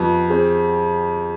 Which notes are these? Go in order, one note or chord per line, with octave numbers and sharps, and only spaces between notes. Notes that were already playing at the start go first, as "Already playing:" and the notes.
Already playing: F2 B3 G4
C4 G#4